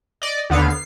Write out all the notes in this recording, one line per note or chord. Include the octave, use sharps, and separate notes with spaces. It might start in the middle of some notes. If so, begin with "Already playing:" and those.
D5 D#5
D#2 D3 B3 F5
C7